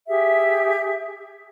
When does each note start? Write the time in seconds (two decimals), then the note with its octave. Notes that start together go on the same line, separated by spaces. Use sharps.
0.08 G4 G#4 E5